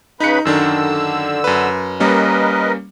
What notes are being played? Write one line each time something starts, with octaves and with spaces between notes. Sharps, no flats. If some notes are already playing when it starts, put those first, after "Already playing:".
C#3 D#4 B4 B5 C#7
F#2 D3 D#3 D4 E6
F#2 B4
G3 A#3 C#4 A#4 B4 D#5